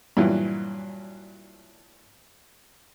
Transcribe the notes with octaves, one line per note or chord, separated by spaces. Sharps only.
G2 A#2 E3 F#3